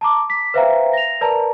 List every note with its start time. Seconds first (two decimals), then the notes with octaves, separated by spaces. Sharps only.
0.01 A5 A#5 D6
0.30 B6
0.54 B4 C5 E5 F5 G5 A#5
0.93 A#6 F7
1.21 A#4 B4 D5 A5 A#5